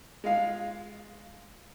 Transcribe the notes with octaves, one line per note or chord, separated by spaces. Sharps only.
G#3 F4 F5